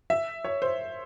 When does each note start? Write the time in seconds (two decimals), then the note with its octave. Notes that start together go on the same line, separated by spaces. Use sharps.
0.10 E5
0.44 C#5
0.62 C5